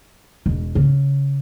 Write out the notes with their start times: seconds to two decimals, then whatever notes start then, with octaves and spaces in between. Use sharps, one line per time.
0.46 E1
0.75 C#3